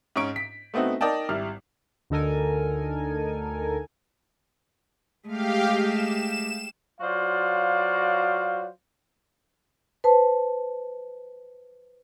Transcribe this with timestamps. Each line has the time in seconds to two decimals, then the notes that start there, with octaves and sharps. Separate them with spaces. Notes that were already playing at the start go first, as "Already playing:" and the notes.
0.16 G#2 C#4 C#6 D7
0.36 B6
0.74 A3 B3 C4 D#4 F#4
1.01 D#4 A#4 D5 D#5 G5 A5
1.29 G#1 G3 E4 F6
2.10 D2 D3 D#4 A4 A#4 G#5
5.28 G#3 A3 G4 F5
5.81 E7
7.01 F#3 F4 F#4 C5 D5 F5
10.04 B4 C5 A5